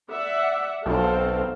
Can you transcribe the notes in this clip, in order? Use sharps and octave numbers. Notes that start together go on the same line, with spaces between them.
D5 E5 F#5
B1 C4 A4 F5